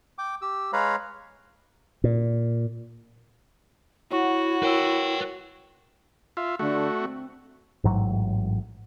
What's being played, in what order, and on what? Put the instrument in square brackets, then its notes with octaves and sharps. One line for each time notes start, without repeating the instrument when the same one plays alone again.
[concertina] G5 D6
G4 E6
G#3 B4 C#5 F5 A#5 B5
[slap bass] A#2
[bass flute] E4 [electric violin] F#4 [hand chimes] C#5 F#5 C#6
[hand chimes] A#4 C#5 E6 [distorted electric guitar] B4 G5
[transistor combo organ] F4 E5
[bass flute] D3 [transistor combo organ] A3 F#4
[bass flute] C4
[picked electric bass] A1 G#2 F#3